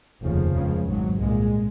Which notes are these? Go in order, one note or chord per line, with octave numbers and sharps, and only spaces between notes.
F1 D#2 C#3 F3
C#2 C#3
G#1 G#2 F#3
C2 A#2 G#3